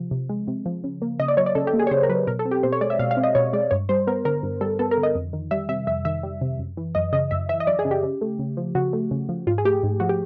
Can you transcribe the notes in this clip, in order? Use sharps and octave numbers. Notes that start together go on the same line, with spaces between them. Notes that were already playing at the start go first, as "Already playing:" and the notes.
Already playing: C3 F3
C3
G#3
C3
F3
C#3
A#3
C#3 D#5
D5
F#3 C#5
D5
C#3 A4
G4
A#3
G#4
C#5
C#3 C5
A#4
F#3 B4
B2 A#4
A4
C4
G4
B2 C5
C#5
G#3 D5
E5
B2 F5
F5
C4
D#5
B2 C#5
G#3 D5
G2 C#5
G3 C5
B3 A#4
D3 A#4
G2
G3 A4
B3 A4
A#4
D3
D#5
F2
D#3
G3 E5
C3 E5
F2 E5
D#3 E5
G3
C3
F#2
E3
F#2 D#5
C#3 D#5
F#2 E5
E3 E5
D#5
F#2 D5
G#4
C#3
G4
C#3
A3
C#3
F3
C#3 F#4
A3
C#3
F3
G#2 F4
G#4
A3 G4
G#2
F3 F#4
G4